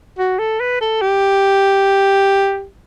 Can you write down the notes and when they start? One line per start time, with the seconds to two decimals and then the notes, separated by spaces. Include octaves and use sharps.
0.18 F#4
0.39 A4
0.60 B4
0.81 A4
1.01 G4